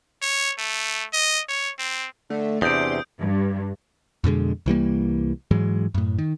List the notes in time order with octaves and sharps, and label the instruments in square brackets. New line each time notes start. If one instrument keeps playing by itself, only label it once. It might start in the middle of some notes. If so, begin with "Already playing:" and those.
[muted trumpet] C#5
A3
D#5
C#5
C4
[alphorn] D3 [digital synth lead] A3
[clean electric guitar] E2 C3 [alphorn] D4 [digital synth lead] C6 [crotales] D#6 G6 D7
[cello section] G2
[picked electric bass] F2 B2 D3 G#3
C2 E3 G3 A#3
G#2 E3 F#3 G#3
F#2 A2
D#3